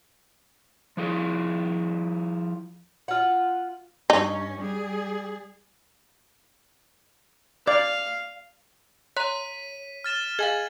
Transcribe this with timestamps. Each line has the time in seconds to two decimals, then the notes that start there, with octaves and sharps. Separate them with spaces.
0.97 F3 E4 F4 G#4
3.08 F4 F#5
4.10 G2 C#4 D#4
4.60 G3 G#4
7.68 D5 F5
9.17 C#5 A#5 C6 F#6 B6 D#7
10.04 F6 A6 E7
10.39 G#4 D#5 F5 G#5 F6 G#6